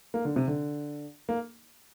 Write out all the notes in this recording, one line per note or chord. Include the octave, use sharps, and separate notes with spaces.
A#3
D3
C3
D3
A#3